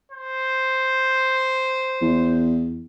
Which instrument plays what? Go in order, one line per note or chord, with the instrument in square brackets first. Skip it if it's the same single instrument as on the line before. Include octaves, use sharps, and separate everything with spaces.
[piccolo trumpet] C5
[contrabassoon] E2